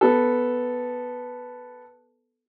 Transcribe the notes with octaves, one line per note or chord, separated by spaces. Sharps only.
B3 A4